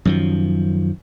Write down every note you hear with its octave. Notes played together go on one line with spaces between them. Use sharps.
F#2 D#3 F3